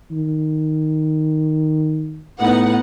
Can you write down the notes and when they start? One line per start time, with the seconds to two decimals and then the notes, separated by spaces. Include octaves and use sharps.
0.12 D#3
2.41 A2 B3 D#4 F#5